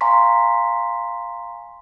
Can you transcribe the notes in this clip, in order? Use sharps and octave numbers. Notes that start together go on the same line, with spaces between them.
F5 G#5 A#5 C6 C#6 B6